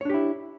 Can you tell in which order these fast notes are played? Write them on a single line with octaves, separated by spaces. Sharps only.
C#5 D4 G4 E4